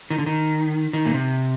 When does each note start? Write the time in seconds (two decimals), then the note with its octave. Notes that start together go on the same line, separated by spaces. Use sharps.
0.10 D#3
0.18 D3
0.26 D#3
0.93 D#3
1.06 A#2
1.14 C3